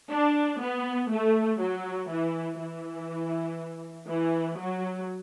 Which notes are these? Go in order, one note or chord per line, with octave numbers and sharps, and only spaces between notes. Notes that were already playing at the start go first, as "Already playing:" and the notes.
D4
B3
A3
F#3
E3
E3
E3
F#3